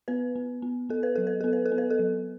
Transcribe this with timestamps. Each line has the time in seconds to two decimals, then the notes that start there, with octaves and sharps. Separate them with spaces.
0.08 B3 B4
0.36 B3
0.62 B3
0.90 B3 A4
1.03 B4
1.16 F#3 A4
1.27 B4
1.41 B3 A4
1.53 B4
1.66 A4
1.72 B3
1.78 B4
1.90 A4
1.99 F#3